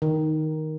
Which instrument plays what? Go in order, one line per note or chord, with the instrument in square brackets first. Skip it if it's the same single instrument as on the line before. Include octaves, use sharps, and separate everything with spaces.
[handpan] D#3